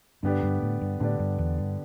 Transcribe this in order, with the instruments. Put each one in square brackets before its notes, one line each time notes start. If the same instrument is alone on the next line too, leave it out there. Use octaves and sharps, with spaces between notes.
[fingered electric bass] G2 [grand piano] D3 B3 D4 G4 D5
[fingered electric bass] G2
A2
G2
[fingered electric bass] A2 [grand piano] D3 B3 D4 G4 D5
[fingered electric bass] G2
E2
G2